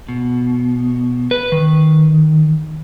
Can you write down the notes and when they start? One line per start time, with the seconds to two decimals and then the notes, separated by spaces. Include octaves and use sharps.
0.09 B2
1.31 B4
1.52 D#3